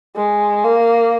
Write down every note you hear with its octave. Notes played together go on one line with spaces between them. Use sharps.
G#3
A#3